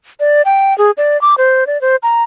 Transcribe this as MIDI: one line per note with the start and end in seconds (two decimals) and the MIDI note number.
0.20 0.42 74
0.45 0.76 79
0.78 0.91 68
0.97 1.20 74
1.22 1.35 86
1.38 1.67 72
1.67 1.80 74
1.81 1.96 72
2.03 2.23 82